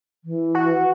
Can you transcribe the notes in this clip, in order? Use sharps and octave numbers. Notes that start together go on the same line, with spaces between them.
E3
F#4